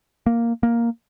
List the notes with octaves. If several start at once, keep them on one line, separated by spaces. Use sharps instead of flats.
A#3
A#3